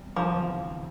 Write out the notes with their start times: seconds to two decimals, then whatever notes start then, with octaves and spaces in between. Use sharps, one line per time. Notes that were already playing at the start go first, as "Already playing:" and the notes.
Already playing: E2 C3 G3
0.16 F3
0.29 E1 D2 C3 E3